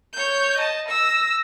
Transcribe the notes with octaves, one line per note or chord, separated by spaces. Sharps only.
C#5 G6
D#5 A5
E6 A#6